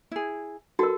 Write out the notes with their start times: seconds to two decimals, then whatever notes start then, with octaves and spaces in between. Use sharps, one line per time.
0.12 E4 G#4
0.79 F#4 A4 A#4